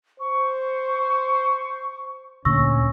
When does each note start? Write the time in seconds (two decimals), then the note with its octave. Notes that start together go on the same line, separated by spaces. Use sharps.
0.20 C5 C#6
2.45 D2 A#2 D3 C#4 C#6 E6 A#6